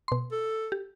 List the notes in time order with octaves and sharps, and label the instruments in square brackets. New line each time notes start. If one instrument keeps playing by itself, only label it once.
[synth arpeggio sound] B2 C6
[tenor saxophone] A4
[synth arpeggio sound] G4